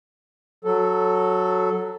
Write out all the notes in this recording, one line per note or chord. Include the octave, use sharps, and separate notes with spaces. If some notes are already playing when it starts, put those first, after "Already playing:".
F#3 A4